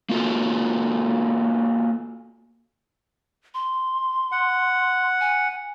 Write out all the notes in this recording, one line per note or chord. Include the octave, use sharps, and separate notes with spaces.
A#3 F4 F#4 A4
C6
F#5
G#5